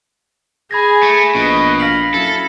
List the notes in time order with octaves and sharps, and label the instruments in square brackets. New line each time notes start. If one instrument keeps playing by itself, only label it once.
[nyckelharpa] G#4 G#5 [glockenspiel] B5 G#6 A#6
[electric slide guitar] A3
[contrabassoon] A#1 [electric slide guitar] B2 [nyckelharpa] B4 D#5
[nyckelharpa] F5 [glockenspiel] A#6 B6 F#7
[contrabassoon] F#2 [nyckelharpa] E4 [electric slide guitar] A4